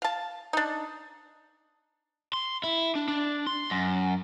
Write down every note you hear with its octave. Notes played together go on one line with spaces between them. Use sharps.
F5 A5
D4 D#4
C6
E4
D4
D4
C6
F#2